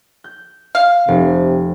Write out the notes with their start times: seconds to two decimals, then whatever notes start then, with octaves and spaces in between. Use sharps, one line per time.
0.24 G6
0.75 F5
1.08 F1 C3